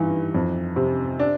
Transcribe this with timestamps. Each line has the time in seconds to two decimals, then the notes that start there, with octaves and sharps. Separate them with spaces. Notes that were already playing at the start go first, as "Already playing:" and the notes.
Already playing: G2 E3 D#4
0.35 F2
0.76 C3
1.20 D4